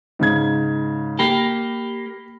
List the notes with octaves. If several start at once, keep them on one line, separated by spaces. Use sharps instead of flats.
G#2 C#3 G#6
A#3 G4 B5